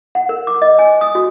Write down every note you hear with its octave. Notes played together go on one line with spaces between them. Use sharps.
F#5
A#4
D6
D#5
G#5
D#6
F#4